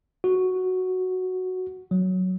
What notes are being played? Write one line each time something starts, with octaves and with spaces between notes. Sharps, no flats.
F#4
F#3